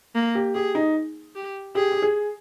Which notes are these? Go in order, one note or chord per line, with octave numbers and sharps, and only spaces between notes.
A#3
G4
G4 G#4
D#4
G4
G4 G#4
G4
G#4